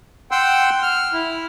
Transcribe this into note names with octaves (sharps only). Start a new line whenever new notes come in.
F#5 G5 C6 E6
F6
E4